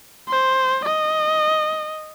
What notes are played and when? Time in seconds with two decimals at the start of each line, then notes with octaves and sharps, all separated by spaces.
0.29 C5
0.85 D#5